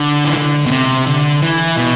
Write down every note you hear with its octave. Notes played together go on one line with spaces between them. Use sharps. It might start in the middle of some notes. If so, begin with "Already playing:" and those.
Already playing: D3
E3
D3
B2
C3
D3
E3
B2